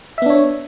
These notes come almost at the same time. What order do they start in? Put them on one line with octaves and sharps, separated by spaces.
E5 B3 D4 C#5